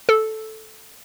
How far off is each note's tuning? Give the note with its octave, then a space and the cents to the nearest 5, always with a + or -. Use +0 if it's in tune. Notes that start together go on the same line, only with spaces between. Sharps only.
A4 -5